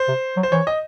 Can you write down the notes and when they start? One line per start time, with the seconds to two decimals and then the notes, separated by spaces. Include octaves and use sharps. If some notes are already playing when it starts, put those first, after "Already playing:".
Already playing: C5
0.08 C3
0.37 F#3
0.43 C5
0.52 E3 C#5
0.67 D#5